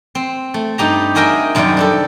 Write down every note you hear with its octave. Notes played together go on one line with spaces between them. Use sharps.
C4
A3
G2 D#4 G4 A#5
F#4 G#4 A#4 D#5 E5 G5
F#2 C3 D#3 G3 D5 G5
D4 G4 A4